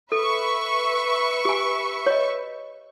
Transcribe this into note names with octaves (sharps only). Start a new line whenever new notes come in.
A4 B4 E5 C#6
G4 G#5
C#5 D#5